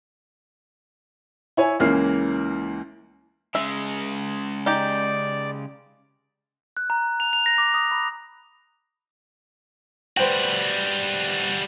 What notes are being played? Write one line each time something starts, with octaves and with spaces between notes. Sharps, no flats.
E4 C#5 G#5
C#2 E3 A#3 C#4 F6 C7
C#3 G#3 E5
D#4 G4 D5
F#6
A#5
F7
F7
A#6
D6
D#6
B5
G3 F#4 B4 C5 G5